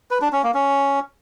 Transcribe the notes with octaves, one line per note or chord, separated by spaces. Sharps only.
B4
D4
C#4
A#3
C#4